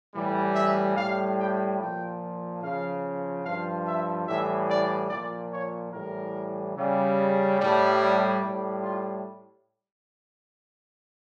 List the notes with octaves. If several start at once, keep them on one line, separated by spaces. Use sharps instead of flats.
A2 E3 G3
E5
A2 G3 F5
G5
A#2 F3 G5
C#3 F3 F5
G2 F3 F5
E5
A2 E3 G3 E5
D5
A#2 F3 D5
C#5
A2 E3 G3 A#4
C#3 G3
A2 G3
A2 G3
F4